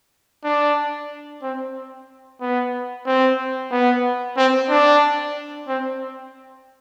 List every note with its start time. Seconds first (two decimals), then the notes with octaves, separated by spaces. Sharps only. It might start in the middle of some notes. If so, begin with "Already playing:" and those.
0.44 D4
1.42 C4
2.41 B3
3.06 C4
3.71 B3
4.37 C4
4.70 D4
5.68 C4